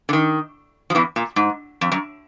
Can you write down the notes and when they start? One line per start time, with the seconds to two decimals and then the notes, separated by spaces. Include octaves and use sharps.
0.09 D3
0.13 D#3
0.90 F3
0.95 E2 E3
1.16 A#2
1.36 G#2
1.81 F2
1.92 F#2